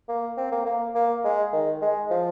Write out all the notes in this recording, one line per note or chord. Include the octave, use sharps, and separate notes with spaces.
A#3
C4
A#3
A#3
A#3
G#3
D#3
G#3
F3